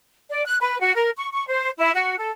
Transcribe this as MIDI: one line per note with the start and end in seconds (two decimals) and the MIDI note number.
0.30 0.44 74
0.46 0.56 90
0.61 0.78 71
0.80 0.93 66
0.95 1.10 70
1.17 1.28 85
1.32 1.45 85
1.47 1.69 72
1.79 1.90 64
1.94 2.16 66
2.19 2.31 69